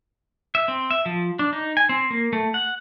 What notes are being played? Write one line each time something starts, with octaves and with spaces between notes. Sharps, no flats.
E5
C4
E5
F3
D4
D#4
G#5
C4
A#3
A3
F#5